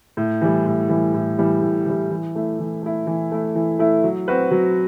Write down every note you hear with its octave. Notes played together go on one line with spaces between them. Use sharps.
A2
E3 G3
A2
E3 G3
A2
E3 G3
A2
E3 G3
E3
A3 E4
E3
A3 E4
E3
A3 E4
E3
A3 E4
F#3
C4 F#4 B4
F#3